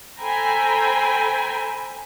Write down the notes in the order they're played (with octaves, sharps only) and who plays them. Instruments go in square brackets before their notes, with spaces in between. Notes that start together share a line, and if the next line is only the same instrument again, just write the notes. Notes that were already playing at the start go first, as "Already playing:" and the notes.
[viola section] A4 C5 G5 G#5 A#5 B5